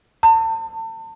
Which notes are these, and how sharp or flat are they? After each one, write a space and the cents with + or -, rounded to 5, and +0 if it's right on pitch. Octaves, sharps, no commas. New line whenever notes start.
A5 +35